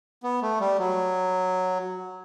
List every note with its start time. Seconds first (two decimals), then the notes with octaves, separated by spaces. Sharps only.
0.23 B3
0.42 A3
0.60 G3
0.78 F#3